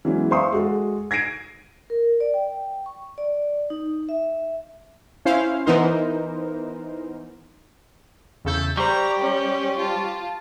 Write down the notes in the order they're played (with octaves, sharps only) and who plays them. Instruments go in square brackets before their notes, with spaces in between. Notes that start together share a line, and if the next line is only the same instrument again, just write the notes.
[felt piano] E3 F#3 G#3 B3 C#4 E4
C5 E5 F5 C6 C#6 D#6
G#3 F#4 A4
G#6 A#6 C7 D7 D#7
[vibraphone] A#4
D5
G5
C#6
D5
D#4
E5
[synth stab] C#4 E4 C5 F5
E3 B3 D#4 A#4 C5
[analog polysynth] E2 C#3 G6 [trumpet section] A3 A4
[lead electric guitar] G3 [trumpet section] G4 [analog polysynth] C5 C#6 [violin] A#5
[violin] C#4
F4 A5